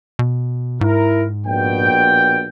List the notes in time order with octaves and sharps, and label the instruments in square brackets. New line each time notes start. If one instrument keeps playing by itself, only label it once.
[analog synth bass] B2
[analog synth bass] G#2 [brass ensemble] E4 A#4
[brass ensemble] A#1 B2 G5